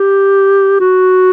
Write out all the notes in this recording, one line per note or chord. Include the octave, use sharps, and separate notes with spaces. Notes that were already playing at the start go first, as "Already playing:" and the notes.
Already playing: G4
F#4